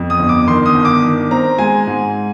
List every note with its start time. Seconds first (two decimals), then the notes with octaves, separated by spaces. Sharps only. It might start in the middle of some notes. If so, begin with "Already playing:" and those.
Already playing: F2
0.10 D#6
0.19 G1
0.29 D6
0.47 D#3 C6
0.66 D#6
0.75 G1
0.85 D6
1.03 D#3
1.31 C4 A#5
1.58 G#3 G#5
1.87 G#2